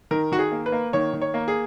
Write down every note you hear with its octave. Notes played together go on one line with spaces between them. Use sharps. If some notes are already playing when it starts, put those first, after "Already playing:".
D#3 A#4
D#3 F#4
G#4
A#3
B4
A#3
D#3 C#5
D#3
C#5
A#3
G#4